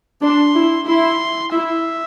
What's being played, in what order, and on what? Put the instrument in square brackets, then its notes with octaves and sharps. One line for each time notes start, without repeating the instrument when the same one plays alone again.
[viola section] D4 [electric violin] C6
[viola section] E4
[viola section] E4 [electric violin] C6
[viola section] E4 [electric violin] E5